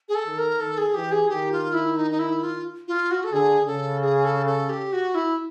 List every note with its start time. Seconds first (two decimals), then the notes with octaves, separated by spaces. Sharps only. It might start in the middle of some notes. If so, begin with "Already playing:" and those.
0.09 G#4
0.15 A4
0.27 D#3
0.38 A#4
0.60 D#3 A4
0.78 G#4
0.94 E3 G4
1.12 G#4
1.29 D#3 G4
1.52 F4
1.74 E4
1.96 D#4
2.11 D#4
2.19 E4
2.43 F4
2.88 F4
3.11 F#4
3.24 A4
3.33 D3 G#4
3.67 C#3 A4
4.02 G#4
4.25 A4
4.47 A4
4.69 G4
4.93 F#4
5.15 E4